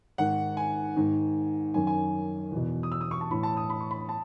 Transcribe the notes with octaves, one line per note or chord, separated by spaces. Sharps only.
G#2 D#3 F#5
G#5
G#2 D#3
F#2 D#3 G#5
G#5
E2
B2
D#6
E6
D#6
C#6
A5
A2 E3 B5
A5
D#6
B5
C#6
B5
A5